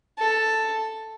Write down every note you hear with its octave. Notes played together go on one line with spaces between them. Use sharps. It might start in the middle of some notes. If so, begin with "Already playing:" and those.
A4